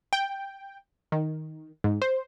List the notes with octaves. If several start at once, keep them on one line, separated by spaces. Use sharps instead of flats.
G5
D#3
G#2
C5